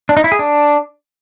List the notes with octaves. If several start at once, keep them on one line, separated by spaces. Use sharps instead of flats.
D4
D#4
E4
G#4
D4